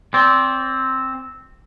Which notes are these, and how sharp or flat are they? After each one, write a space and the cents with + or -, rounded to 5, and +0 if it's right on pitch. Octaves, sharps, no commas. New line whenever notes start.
C4 +5 D5 -35